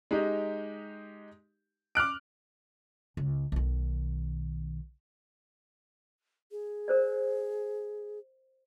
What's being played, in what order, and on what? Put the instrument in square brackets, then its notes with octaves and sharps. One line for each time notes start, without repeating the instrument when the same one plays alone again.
[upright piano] G#3 D#4 G4
D6 F6 F#6 D7
[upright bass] C#2
B1 D#3
[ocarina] G#4
[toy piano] A#4 C5 D5